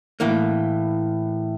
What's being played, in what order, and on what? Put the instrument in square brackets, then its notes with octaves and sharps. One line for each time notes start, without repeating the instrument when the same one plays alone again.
[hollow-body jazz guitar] A2 E3 A#3